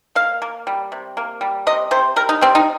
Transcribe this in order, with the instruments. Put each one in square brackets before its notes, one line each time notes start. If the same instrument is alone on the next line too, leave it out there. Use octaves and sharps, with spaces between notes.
[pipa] A#3 F5
A#3
G3
C3
A#3
G3
C3 D#5
C3 C5
G3 A#4
D#4
G3 C4
D#4